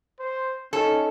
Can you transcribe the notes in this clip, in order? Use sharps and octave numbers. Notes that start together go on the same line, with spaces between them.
C5
C#4 D#4 A4 C#5 D#5